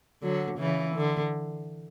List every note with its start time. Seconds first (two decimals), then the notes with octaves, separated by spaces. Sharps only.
0.22 D3 F#3
0.59 C#3 E3
0.95 D3